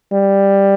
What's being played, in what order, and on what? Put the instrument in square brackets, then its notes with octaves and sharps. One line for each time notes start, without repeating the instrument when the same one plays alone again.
[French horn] G3